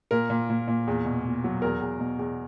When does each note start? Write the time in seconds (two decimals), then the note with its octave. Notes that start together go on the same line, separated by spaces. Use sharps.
0.11 A#2 A#4
0.30 A#2
0.50 A#2
0.68 A#2
0.87 E2
1.05 B2
1.25 B2
1.44 F#3
1.62 E2 A#4
1.82 E2
2.00 B2
2.19 E2